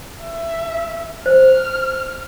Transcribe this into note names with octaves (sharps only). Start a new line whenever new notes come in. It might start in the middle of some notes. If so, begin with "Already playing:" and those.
E5
C5 F6